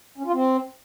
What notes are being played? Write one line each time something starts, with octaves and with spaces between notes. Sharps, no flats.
C#4
F4
C4